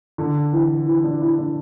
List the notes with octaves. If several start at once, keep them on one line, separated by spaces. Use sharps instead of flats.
D3
E3
E3
D4
E4
D4